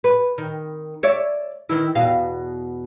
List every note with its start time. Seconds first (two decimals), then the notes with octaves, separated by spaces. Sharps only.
0.04 B4
0.38 D#3
1.03 C#5 D5 E5
1.69 D#3 E3 E4
1.95 E2 B2 F5